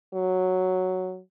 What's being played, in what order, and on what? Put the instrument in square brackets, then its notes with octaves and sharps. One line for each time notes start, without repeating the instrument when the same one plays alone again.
[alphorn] F#3